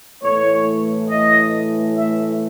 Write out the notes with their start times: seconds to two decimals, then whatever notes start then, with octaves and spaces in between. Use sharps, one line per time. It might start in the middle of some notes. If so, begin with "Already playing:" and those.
0.23 A2 E3 A3 C#5
1.09 D#5
1.95 E5